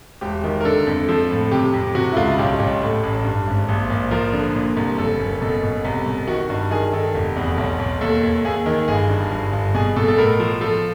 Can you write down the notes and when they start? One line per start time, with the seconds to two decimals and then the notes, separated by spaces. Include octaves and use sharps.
0.21 E1 G4
0.44 D#3
0.61 A#4
0.65 D3 A4
0.87 F2
1.08 F3 A4
1.30 A2
1.51 C3 G4
1.73 F2
1.95 C3 F#4
2.12 E4
2.17 C#2 F4
2.38 B1 G4
2.59 B1
2.82 A2
3.03 A1
3.25 G2
3.47 G#1
3.68 A#1
3.90 A#1
4.11 F3 A#4
4.33 D3
4.55 A#2
4.77 C2
4.98 F#1 A4
5.20 F#1
5.42 B2 A4
5.63 B2
5.85 C2
6.06 B2
6.28 D#3 F#4
6.50 G2
6.71 D#3 G#4
6.93 D#3 A4
7.15 F1
7.36 E2
7.57 B1
7.79 B1
8.01 D#2 A4
8.23 D#2
8.44 D#2 G#4
8.66 D#3
8.88 G1 G#4
9.09 G2
9.31 G1
9.53 G1
9.74 B2 G#4
9.96 B2 A4
10.08 A4
10.17 A2 A#4
10.40 F3
10.61 F3 A4